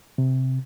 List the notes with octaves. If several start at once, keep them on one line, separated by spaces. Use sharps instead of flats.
C3